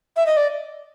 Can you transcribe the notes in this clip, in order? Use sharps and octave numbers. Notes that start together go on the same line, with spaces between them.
E5
D#5
D5